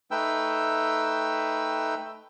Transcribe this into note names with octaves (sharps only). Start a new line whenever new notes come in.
A3 D#4 B4 G5 E6